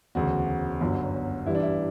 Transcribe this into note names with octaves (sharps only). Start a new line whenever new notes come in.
E1 D2 C#3 F#4
G1 F#2 D3 F#3
A1 G2 E3 G3 E4
D4
E4